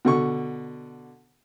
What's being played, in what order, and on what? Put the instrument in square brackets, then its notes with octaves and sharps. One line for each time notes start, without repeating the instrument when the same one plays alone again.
[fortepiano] B2 D3 C#6